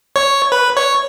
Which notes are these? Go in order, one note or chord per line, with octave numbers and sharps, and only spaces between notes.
C#5
B4
C#5